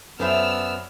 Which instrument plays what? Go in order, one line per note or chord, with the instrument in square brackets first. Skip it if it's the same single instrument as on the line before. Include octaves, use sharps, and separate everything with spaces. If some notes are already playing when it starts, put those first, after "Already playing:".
[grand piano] F#2 [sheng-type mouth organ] B3 [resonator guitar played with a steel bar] A4 C5 E5 [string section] D5 E6 F6